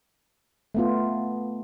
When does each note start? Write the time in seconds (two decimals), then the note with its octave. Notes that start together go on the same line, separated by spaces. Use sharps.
0.75 A3 B3 F4